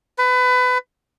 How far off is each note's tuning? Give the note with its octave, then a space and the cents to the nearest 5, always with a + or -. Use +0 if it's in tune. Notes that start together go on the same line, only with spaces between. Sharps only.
B4 +25